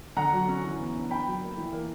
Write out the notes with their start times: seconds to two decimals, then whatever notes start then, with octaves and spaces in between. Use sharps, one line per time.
0.17 D3 F#5 A#5
0.33 F#3
0.49 C#4
0.64 E3
0.79 B3
0.94 D4
1.11 D4 G5 B5
1.26 F#3
1.42 A#3
1.57 E3
1.73 A#3